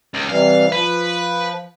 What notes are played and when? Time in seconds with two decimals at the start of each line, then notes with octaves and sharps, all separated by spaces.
0.14 C#2
0.29 C3 E3 G3 F5
0.72 F3 B4